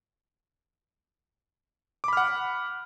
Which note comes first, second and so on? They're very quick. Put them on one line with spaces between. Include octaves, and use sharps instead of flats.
D6 B5 F6 F#5